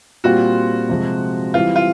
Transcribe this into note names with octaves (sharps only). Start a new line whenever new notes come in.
A#2 G3 C4 F4 F#4
C3 F3 G#3
E3 G3 C4 E4 F4
F4